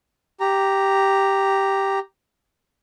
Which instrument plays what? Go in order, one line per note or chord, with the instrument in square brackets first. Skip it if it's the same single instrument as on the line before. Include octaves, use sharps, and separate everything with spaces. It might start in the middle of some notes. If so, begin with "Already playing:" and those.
[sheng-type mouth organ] G4 A#5